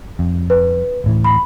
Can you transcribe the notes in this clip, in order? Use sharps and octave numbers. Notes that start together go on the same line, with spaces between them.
F2
B4
D1 A2 E3
B5